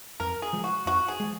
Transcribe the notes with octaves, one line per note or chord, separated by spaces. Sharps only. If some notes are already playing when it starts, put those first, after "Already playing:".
F2 A#4
G#4
F3 G#3
F#4
F2 F#4
G#4
F3 G#3